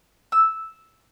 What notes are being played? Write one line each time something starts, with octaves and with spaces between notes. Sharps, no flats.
E6